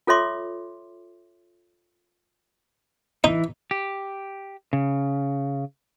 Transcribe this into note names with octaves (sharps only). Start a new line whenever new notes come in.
F4 A4 C#5 E5 C6 D6
E3 D#4
G4
C#3